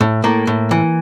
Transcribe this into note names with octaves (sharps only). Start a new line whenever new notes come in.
A2
A2 A#3
A2
E3